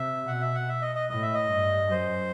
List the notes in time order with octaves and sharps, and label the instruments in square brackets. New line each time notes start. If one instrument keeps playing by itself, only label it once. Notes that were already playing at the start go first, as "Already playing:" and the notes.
Already playing: [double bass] C3 [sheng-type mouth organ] E5
[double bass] B2 [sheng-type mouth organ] F#5
[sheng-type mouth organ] E5
F#5
E5
D#5
D#5
[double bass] A2 [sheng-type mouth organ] D#5
[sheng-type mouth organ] E5
D#5
[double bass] G2
[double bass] F#2 [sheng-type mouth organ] C5